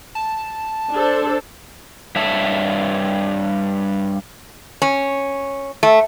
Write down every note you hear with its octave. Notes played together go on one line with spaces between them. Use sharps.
A5
D4 A4 C5
G2 C#5 E5 A5
C#4
A3